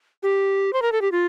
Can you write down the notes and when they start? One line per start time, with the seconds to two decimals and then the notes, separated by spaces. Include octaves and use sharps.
0.23 G4
0.73 C5
0.82 A#4
0.92 A4
1.01 G4
1.12 F4